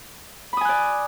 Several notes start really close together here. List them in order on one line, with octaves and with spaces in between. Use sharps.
B5 D#6 G#5 F#6 D5